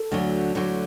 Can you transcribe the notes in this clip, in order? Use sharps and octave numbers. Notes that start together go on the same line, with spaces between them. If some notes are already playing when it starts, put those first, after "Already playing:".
Already playing: A4
D2 D3 F#3
D2 D3 F#3